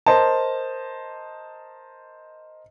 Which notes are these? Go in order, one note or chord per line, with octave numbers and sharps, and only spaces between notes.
A#4 C5 D#5 A5